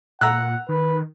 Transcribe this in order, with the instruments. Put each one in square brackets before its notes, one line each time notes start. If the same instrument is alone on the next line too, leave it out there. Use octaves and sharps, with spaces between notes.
[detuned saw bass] A#2 [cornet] F#5 [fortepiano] A#5 E6 F#6
[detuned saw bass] D#3 [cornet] B4